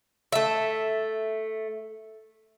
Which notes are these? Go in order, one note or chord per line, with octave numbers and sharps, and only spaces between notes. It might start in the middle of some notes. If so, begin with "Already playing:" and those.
A3 E5